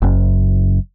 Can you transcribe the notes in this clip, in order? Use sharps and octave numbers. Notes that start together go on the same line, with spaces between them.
F#1 F#2